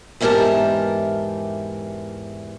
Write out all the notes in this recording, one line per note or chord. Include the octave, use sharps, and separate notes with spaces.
E2 G#2 E3 G4 A#4 A5